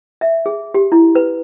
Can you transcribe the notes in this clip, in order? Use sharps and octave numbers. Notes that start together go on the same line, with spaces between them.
E5
G#4
G4
E4
B4